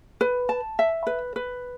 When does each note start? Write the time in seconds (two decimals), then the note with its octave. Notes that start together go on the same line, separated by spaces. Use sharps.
0.21 B4
0.49 A5
0.79 E5
1.07 B4
1.36 B4